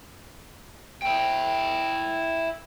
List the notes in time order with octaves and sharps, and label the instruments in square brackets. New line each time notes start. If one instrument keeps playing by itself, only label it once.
[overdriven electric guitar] E4 G5